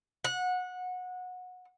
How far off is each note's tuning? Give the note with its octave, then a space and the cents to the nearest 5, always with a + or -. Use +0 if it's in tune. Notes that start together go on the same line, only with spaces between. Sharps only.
F#5 -20